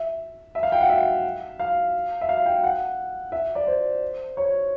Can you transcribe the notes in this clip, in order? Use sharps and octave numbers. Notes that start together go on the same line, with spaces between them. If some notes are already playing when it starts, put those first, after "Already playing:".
Already playing: E5
E5
F5
G5
F#5
E5
F5
E5
F5
G5
F#5
E5
D5
C5
C#5